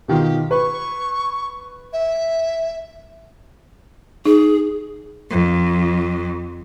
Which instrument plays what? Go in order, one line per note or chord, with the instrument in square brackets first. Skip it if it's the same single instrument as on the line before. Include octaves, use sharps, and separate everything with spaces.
[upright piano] B2 D#3 F4 [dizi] G4
[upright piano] B4 [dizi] C#6
[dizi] E5
[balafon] D#4 [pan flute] G#4
[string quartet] F2